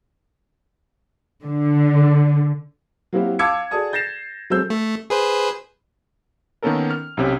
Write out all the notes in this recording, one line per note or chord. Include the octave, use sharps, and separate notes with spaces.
D3
F#3 A#3 C4 E4 F#4 G4
F5 A5 D6 E6 G#6 C#7
F#4 G#4 A4 D5 A5 D#6
G6 A6 A#6 C7 E7
F#3 G#3 C4 A4 E6 G6
A3
G#4 B4 C5
D#3 A#3 B3 C#4 A4 A#4
F6
B1 C3 C#4